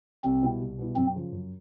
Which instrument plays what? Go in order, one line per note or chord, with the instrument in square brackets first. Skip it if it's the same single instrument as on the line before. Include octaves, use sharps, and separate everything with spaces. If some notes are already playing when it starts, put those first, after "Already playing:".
[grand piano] C2 [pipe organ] C4
[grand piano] B2 G3 B3 E4
C2
B2 G3 B3 E4
[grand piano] F#2 [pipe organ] C4
[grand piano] C#3 F3
F#2